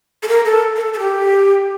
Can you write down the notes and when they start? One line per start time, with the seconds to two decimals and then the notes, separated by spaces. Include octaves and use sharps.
0.23 A4
0.28 A#4
0.45 A4
0.76 A#4
0.81 A4
0.93 A4
0.99 G4